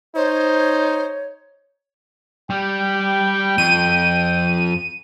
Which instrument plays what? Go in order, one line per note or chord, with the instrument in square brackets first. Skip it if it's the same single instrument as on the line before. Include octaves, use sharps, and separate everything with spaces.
[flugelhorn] D#4 [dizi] C5 [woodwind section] C#5
[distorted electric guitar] G3 [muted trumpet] G5
[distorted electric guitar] F2 [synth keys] D#7